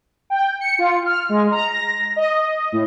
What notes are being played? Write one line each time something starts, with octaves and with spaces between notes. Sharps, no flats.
G5
C#7
F4
F6
G#3
A#5
A#6
D#5
A2